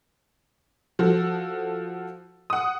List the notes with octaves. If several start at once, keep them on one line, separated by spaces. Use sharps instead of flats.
F3 F#4 A4
F#5 D#6